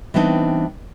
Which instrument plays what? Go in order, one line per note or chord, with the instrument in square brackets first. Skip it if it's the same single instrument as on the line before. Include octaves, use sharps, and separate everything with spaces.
[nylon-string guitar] E3 G3 B3 C4 D4 D#4